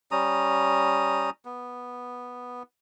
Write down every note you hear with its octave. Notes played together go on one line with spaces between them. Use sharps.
G3 C#4 A#5 D#6
B3